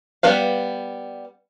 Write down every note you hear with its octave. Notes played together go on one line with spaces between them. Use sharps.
G3 B3 B4 F5